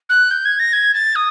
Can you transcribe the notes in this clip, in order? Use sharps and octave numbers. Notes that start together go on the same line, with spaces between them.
F#6
G6
G#6
A#6
G#6
A6
D#6